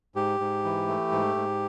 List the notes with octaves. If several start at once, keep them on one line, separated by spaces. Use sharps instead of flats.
G#2 G4
G#2
E3
A3
G#2
G#2